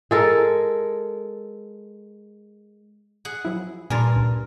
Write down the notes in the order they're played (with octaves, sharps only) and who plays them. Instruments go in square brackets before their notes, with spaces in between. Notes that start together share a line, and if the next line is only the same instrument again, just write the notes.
[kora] G#3 A4 A#4
[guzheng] G#4 F#5
[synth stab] F3 F#3 E4
[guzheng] G2 A#4 [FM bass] A#2 [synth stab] G#5 A5 C6
[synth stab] C#2